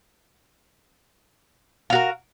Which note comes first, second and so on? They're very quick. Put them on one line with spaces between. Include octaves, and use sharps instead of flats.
F5 F#4 A#4